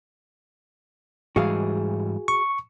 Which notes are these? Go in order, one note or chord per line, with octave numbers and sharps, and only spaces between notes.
G#2 E3 G3 F#4 G#4 F5
C#6